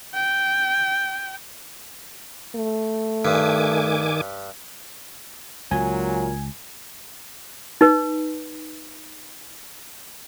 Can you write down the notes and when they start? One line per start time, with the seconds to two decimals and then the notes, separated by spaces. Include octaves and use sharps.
0.14 G5
2.56 A3
3.25 G2 D#3 G#5 D6
5.71 C#2 A#2 F#3 G#5
7.81 D#4 B4